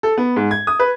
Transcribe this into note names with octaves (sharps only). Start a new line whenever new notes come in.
A4
B3
G#2
G#6
D#6
B4